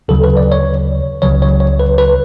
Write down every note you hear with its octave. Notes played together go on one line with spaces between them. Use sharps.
D2 C#3 F#3 A4
B4
D5
C#5
C#2 C#3 F#3 C#5
C#5
C#5
B4
B4